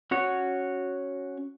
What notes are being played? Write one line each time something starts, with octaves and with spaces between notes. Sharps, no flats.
C#4 F#4 C#5